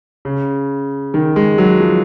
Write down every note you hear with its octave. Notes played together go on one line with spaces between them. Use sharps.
C#3
D#3
G#3
F#3
F3